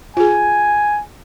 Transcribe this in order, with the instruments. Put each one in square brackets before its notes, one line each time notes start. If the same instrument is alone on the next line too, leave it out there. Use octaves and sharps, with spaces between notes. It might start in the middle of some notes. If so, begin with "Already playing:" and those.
[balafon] F4 G#4 [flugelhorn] G#5